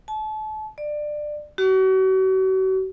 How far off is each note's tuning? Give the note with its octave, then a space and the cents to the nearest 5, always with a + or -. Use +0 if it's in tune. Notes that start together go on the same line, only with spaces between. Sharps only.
A5 -35
D5 +20
F#4 +40